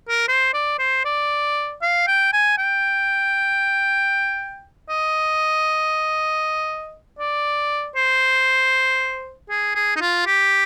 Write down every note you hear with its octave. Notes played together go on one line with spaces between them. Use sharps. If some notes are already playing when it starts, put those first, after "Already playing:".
A#4
C5
D5
C5
D5
F5
G5
G#5
G5
D#5
D5
C5
G#4
G#4
D#4
F4
G4